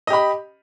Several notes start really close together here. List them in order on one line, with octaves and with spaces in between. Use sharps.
D#5 G4 B5